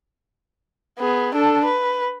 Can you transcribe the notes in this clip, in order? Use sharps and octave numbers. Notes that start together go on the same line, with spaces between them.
B3 G#4
D4 A4
B4